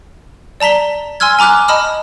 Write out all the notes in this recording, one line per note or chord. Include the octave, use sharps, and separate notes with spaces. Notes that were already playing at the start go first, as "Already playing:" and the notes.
D5 A5 A#5 B6 G7
G#5 C6 E6 F6 G#6
G#5 A#5 D6 F6 F#6
D#5 A5 B5 D#6 F6